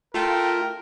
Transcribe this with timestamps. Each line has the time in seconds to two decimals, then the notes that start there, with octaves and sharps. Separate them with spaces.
0.14 A3 F4 A#4 G5